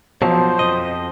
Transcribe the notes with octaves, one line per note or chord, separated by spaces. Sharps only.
B2 F3 F#3 C5
F2 C3 D#5